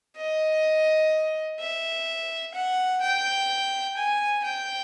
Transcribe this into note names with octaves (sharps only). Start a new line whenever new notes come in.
D#5
E5
F#5
G5
G#5
G5